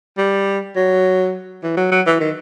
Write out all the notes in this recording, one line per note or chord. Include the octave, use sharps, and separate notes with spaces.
G3
F#3
E3
F#3
F#3
E3
D#3